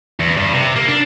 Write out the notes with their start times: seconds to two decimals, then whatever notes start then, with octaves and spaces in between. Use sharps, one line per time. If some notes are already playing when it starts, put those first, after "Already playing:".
0.20 E2
0.37 G2
0.53 C3
0.76 A#3
0.88 D4